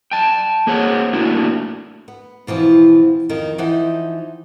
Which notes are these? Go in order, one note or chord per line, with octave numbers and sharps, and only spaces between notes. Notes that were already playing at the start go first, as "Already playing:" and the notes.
G5 A5
A#3 G#4 C5 C#5 F#5
A2 A3 A#3 D4 E4 F#4
B3
B2 E3 F3 C4
F2 D#3
E3 F3 D#4 F#5 G5